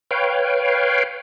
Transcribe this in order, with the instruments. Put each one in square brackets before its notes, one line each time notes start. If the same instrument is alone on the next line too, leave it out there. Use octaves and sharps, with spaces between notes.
[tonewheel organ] B4 C#5 F5 G5